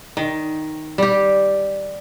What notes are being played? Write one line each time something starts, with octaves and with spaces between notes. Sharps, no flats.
D#3
G3 G4